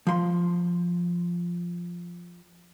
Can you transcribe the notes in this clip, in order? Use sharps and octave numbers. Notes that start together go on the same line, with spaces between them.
F3 C6